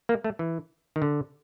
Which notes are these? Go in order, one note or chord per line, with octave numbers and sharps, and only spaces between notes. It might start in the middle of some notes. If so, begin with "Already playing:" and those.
A#3
A3
E3
D#3
D3